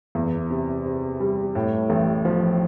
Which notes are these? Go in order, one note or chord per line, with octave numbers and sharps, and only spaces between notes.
E2
C3
C3
G3
A2
A1
F3